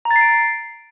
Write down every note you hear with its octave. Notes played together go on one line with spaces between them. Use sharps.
A#5
A6
C7
D7